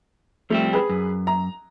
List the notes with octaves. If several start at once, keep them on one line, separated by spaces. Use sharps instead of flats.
F3 G3 A3 C4
G#4 B4
F#2
A#5